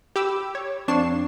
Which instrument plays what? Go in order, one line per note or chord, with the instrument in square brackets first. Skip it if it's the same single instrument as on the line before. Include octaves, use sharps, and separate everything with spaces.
[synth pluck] G4 B5 D6 E6
C#5
F2 D4 C#6 C7 E7